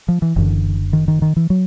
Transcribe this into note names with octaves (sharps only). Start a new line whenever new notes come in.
F3
E3
F#1 F#2 D3 E3
D#3
D#3
D#3
E3
F#3